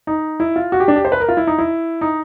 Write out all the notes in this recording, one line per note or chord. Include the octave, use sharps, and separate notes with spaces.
D#4
E4
F4
F#4
G4
D4
G4
C5
B4
A#4
F4
E4
D#4
E4
D#4